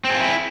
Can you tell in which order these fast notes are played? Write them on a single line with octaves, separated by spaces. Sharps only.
C4 G#4 F4 E4